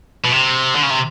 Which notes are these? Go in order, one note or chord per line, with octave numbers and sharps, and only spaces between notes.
B2
C3
D3
C#3
C3